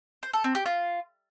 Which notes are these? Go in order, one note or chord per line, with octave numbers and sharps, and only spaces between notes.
C5
A4
C4
G4
F4